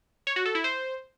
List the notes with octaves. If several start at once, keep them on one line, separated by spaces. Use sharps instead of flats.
C#5
F#4
A4
E4
C5